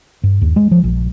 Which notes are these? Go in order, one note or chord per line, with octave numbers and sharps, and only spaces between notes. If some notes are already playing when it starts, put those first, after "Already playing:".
G2
D#2
G#3
F3
A#1